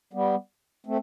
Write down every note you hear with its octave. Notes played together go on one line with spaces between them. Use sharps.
G3 B3
A3 C4